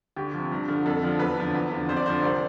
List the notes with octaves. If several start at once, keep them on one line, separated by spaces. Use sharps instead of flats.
D2 G4
C3 F3
G2
D3 F3
F2 A4
D3 F3
E2 B4
D3 F3
E2
D3 F3
F2 C5
D5
D3 F3 C5
C2 D5